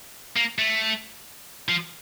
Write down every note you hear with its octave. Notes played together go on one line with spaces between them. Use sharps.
A#3
A3
F3